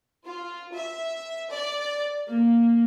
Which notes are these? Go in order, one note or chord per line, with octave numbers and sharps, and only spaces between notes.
F4
E5
D5
A#3